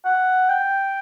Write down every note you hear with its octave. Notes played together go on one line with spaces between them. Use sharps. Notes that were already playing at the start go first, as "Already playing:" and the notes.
F#5
G5